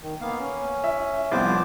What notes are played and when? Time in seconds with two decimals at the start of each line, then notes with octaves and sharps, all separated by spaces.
0.01 D#3
0.21 A#3 B3 F5
0.39 C#4
0.84 E5
1.31 C2 F3 B3 C5 D6